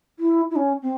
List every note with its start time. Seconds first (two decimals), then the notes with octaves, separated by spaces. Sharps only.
0.19 E4
0.51 E4
0.56 C#4
0.82 C4